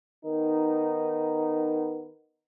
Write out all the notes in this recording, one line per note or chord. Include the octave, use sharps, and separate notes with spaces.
D#3 B3 D#4